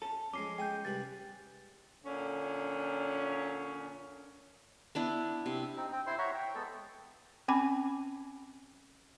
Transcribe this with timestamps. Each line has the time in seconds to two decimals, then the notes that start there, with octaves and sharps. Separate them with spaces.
0.02 C#4 A4
0.34 F2 G#3 C#4 D6 C7
0.58 G#3 G5 G#5 D#6 G6
0.85 C2 G3 B4 A6
2.03 A#2 D3 C#4
4.95 B3 D4 E4
5.46 C3
5.77 C4 D#4
5.92 C4 G5
6.07 E4 C5 C6
6.18 C#5 E5 F#5 A#5
6.34 G5
6.55 G#3 B3 A4
7.48 C4 C#4 G#5 B5 D6